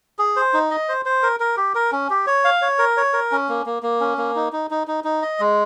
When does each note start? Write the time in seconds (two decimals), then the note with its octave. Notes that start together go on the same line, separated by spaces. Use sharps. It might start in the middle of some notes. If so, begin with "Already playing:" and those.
0.19 G#4
0.36 C5
0.53 D#4
0.71 D#5
0.88 C5
1.05 C5
1.23 A#4
1.40 A#4
1.57 G4
1.75 A#4
1.92 C#4
2.10 G4
2.27 C#5
2.45 F5
2.62 C#5
2.79 A#4
2.97 C#5
3.13 A#4
3.32 C#4
3.49 A#3
3.66 A#3
3.83 A#3
4.00 C#4
4.18 A#3
4.36 D#4
4.52 D#4
4.71 D#4
4.87 D#4
5.04 D#4
5.22 D#5
5.40 G#3